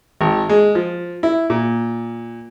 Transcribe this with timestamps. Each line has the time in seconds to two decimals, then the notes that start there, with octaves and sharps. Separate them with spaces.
0.21 G#1
0.49 G#3
0.75 F3
1.23 E4
1.50 A#2